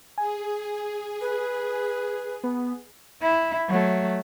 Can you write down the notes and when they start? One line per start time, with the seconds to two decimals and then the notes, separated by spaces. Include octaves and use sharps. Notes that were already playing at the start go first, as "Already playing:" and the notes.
0.18 G#4 G#5
1.21 B4
2.43 B3
3.21 E4
3.68 F#3 A3